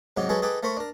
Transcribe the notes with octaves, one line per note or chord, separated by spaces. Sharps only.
G#2 C3 F#3 D#4 G4
F#3 G#3 C#4 G#4 A4 B4
D#4 G#4 A4 B4 G5 D6
A3 A#4 C5 B5 C#6
D4 A#4